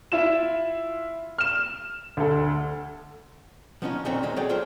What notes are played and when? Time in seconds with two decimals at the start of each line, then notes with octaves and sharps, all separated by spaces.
0.12 E4 F4 E7
1.38 F6 E7
2.17 D2 A4
3.82 F3 B3 C#4 D#4 F4
4.05 D#2 A#2 D3 C4 C#4
4.23 D#3 F#3 G#3 A#3
4.36 F#3 A3 G#4 C#5 D5 G5
4.49 A3 F4 G#4 C5